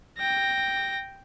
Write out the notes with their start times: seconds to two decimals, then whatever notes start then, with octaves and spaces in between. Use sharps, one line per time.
0.18 G5 A#6